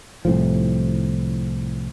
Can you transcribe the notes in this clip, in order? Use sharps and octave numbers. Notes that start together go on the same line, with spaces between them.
C2 A2 F3